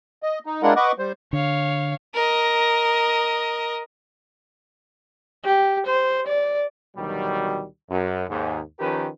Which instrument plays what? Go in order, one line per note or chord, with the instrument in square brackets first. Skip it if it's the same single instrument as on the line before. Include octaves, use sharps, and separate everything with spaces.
[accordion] D#5
D#4
G#3 D4 E4 F4 A#4 F#5
B4 D#5 F#5 C#6 D6
G3 C5
[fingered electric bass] D3 [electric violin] C#5 F5
[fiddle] A#4 D#5
[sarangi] G4
C5
D5
[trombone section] D2 B2 D#3 F#3 G3
F#2
D#2 G#2
D#3 F3 C#4 G4 A#4 B4